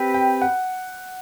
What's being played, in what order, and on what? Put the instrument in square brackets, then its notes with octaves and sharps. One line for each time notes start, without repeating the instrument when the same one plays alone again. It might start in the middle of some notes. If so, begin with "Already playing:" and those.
Already playing: [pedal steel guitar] C4 G4 B4
[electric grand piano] G5
F#5